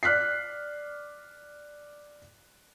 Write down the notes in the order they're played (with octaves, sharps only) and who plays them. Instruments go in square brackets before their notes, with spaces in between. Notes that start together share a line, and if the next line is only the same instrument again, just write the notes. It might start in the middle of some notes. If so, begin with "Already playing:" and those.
[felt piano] D5 F6 F#6 B6 C7